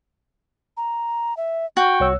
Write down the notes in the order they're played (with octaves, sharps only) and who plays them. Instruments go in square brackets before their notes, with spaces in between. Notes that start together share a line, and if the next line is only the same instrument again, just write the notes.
[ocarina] A#5
E5
[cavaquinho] F#4 [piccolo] G5 [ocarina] C#6
[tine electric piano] C2 C#5 E6